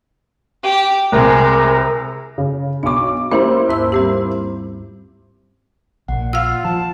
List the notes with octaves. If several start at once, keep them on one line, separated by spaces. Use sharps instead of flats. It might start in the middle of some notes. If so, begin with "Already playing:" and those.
G4
C2 C3 G#3 A#4
C#3
B1 D4 C#6 D6
A#3 C#4 E4 G4 C5
D#2 G#2 E6
G3 C4 G4
A#1 A#2 F#5
F4 F5 F#5 E6
F3 A5